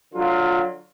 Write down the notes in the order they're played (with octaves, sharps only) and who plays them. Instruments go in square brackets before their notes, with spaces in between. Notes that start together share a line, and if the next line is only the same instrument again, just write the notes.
[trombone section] D3 F#3 F4